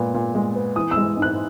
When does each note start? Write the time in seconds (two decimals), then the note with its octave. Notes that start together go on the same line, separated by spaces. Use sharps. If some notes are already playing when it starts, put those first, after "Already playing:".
Already playing: A#2 G#3 B3
0.14 A#2
0.35 G#3
0.55 B3
0.76 E3 D#6
0.91 E6
0.97 G#3
1.17 G#2
1.22 F#6